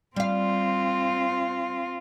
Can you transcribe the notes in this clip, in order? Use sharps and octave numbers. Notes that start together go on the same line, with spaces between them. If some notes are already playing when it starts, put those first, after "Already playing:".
G3 C4 F4 F5